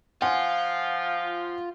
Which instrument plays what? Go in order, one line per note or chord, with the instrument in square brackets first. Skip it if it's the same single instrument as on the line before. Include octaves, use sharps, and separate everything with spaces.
[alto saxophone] F3 [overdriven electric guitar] F4 [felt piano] F#5 G#5